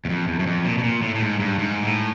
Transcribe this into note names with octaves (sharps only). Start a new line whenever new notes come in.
E2
F2
E2
F#2
F2
A#2
B2
A#2
A2
A2
G#2
G2
G#2
A2